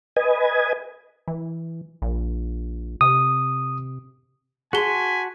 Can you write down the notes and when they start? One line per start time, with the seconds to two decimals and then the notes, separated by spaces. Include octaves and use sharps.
0.16 B4 D#5 G#5
1.28 E3
2.02 A#1
3.01 C3 D#6
4.73 F#4 G#4 G#5 A5 C6 B6 G7